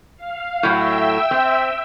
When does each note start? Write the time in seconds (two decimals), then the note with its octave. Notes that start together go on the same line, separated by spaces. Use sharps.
0.17 F5
0.63 A2 F#3 E5 G5 E6
1.31 C4